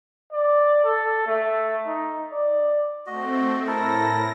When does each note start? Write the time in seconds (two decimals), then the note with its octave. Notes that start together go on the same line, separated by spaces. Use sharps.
0.32 D5
0.84 A4
1.27 A3
1.87 D#4
2.32 D5
3.07 A3 C4 F#4 D#5
3.67 A2 E4 A4 A#4 A#6